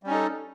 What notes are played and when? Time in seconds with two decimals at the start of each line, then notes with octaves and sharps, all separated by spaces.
0.03 G3
0.06 C#4
0.10 D#4
0.14 A4